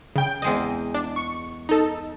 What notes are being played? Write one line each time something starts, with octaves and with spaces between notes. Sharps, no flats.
C#3 G5
E2 G#3 D#5
D4
C#6
D#4 A4